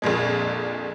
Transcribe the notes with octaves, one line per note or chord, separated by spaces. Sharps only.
A#1 F2 A#2 G#3